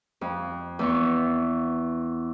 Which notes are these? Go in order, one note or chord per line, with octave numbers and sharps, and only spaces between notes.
F2
E2 B3 C#6